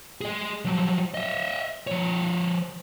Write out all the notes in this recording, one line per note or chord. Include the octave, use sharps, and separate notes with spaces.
G#4 D#5
F3 F#3
D#5 E5
F3 C#5